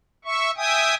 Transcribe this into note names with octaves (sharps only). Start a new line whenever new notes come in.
E5 C#6
E5 G5 G#5 D#6